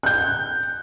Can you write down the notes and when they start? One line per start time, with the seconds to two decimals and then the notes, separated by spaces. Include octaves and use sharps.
0.03 F#6 G6